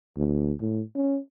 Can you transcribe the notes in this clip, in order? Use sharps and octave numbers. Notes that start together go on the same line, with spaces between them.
D2
A2
C#4